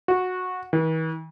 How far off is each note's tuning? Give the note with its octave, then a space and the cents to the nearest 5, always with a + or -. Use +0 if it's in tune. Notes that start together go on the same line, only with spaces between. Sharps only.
F#4 -15
E3 -45